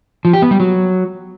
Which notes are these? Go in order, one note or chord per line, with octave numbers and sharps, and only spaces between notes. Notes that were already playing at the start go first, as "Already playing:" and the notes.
F3
G4
B3
G3
F#3